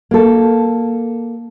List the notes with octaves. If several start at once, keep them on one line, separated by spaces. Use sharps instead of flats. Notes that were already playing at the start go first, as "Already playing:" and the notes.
A#3 A4